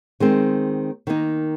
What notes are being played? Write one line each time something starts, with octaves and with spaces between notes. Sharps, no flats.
D#3 G#3 C4
D#3 A#3 D#4